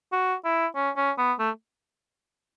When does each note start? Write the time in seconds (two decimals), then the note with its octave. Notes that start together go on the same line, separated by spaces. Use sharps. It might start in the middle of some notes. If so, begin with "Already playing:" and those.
0.13 F#4
0.45 E4
0.75 C#4
0.97 C#4
1.18 B3
1.39 A3